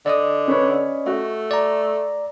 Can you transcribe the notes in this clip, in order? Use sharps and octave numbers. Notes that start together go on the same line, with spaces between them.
D3 D5 D#5 D#6
C#4 B4 C#5
A3 F#4
D5 A#5